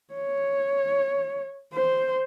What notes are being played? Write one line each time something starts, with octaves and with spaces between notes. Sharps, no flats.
C#5
C5